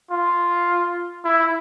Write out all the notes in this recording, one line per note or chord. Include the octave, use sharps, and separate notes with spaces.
F4
E4